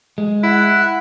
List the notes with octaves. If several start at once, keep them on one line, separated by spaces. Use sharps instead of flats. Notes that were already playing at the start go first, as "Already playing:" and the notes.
G#3
E4 F#5 F#6